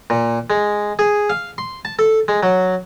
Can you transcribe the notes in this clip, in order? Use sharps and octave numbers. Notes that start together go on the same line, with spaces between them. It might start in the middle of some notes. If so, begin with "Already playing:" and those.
A#2
G#3
G#4
F5
C6
A5
A4
G#3
F#3